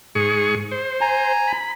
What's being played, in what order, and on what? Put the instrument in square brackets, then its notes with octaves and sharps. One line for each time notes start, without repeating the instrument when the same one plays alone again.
[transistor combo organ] G#2 G#4 C#6
C5
[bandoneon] G#5 A#5
[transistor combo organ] B5